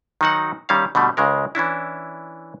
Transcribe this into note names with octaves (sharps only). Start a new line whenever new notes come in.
D#3 F#3 D#4 F#4 F#5
D#3 G3 C#4 E5 F5
B2 D3 G3 A3
C#2 C#3 G#3 A#4
E3 C#4 D4 E4